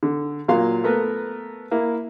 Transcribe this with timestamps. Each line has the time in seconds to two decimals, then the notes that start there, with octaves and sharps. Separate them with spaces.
0.03 D3
0.48 A#2 F#3 A#3 F5 C6
0.84 A3 B3 A#4 B4
1.71 A#3 E4